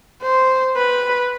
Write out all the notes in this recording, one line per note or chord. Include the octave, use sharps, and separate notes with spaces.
C5
B4